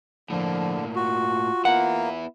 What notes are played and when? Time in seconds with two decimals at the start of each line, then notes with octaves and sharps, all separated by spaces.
0.30 A2 D3 F3 A#3
0.96 F4 F#4
1.65 A#3 B3 E4 F#5